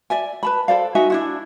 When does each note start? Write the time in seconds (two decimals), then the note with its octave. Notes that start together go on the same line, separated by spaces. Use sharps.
0.10 D5 E5 G#5
0.43 B4 A5 B5
0.68 A4 C5 D5 F5
0.95 D#4 F#4 E5 G#5
1.10 D4 E4 F#4